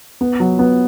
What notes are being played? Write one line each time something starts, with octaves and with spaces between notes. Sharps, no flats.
B3
F#3
B3